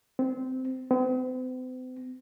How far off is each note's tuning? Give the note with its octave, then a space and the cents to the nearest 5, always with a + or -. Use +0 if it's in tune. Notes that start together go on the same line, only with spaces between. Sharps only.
C4 -15
C4 -45